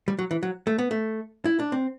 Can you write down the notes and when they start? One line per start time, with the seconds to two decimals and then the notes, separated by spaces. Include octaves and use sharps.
0.08 G3
0.19 F#3
0.31 E3
0.43 F#3
0.67 A3
0.78 B3
0.91 A3
1.45 E4
1.59 D4
1.72 C4